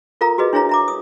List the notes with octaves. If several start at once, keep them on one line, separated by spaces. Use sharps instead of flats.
F4 A4 A#4 F5 A#5
F#4 G#4 B4 D#5
D4 E4 G#4 C#5 F5 A#5
E5 A#5 D6
D#6